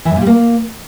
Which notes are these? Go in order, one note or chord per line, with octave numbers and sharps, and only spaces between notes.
E3
F#2
A#2
G3
A#3